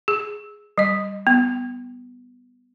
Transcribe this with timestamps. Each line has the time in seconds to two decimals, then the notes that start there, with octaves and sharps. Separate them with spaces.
0.08 G#4
0.78 G3 D#5
1.27 B3